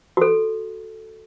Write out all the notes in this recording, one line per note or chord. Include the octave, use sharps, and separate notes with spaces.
F#4 A4